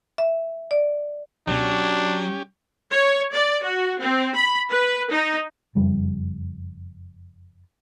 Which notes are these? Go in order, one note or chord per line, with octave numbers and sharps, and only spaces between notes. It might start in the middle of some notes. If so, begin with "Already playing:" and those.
E5
D5
C#2 B2 F#3 C#4 D4 G4
C#5
D5
F#4
C4
B5
B4
D#4
F#1 F2 G3